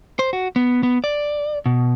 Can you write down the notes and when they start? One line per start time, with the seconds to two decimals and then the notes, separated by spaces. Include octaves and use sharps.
0.19 C5
0.33 F#4
0.56 B3
0.83 B3
1.04 D5
1.66 B2